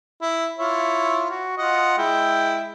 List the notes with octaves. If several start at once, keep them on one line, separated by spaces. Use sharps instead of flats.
E4
E4 F4 C#5
F#4
F4 D#5 F#5
G#3 E4 G5